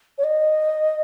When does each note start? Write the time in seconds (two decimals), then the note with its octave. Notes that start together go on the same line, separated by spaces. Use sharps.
0.18 C#5
0.24 D#5